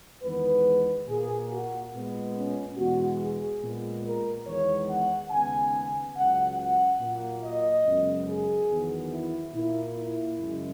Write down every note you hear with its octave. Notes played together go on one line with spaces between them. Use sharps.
E2 D#3 G#3 B3 B4
A#2 A#3 G#4
F#4
A#2 G#3 B3
C#4
E2 B2 G#3 B3 F#4
G#4
A#2 G#3 B3
A#4
E2 D#3 G#3 B3 C#5
F#5
D#2 C#3 G#3 B3 G#5
C#2 C#3 F#3 F#5
F#5
A#2 F#3 A#3
D#5
F#2 C#3 G#3 B3
G#4
E2 D#3 F#3 B3
E4
A#2 A#3 E4
E4
F#2 C#3 G#3